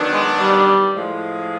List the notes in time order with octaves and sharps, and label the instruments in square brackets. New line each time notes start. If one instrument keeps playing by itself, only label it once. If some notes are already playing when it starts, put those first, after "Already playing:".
Already playing: [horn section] D#3 F#3 B3 D4
[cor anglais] G#3
G3
[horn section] A2 F3 G#3